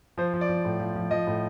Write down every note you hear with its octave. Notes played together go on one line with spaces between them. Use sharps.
F3 C5
F3
D5
F3
A2
F3
F3
F3 D#5
A2